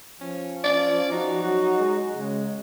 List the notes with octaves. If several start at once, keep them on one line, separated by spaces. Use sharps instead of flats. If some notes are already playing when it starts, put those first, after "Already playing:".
F3 C#4
C#4 D5
D#4 F#4
F#3 F#4
G#3
C#3 G#3